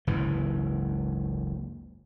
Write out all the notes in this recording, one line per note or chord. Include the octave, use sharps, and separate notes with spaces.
F#1 C#2 G#2 E3